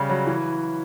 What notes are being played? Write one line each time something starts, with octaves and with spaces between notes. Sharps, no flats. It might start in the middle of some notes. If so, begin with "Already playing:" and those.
Already playing: C#3 G3
F#3
E3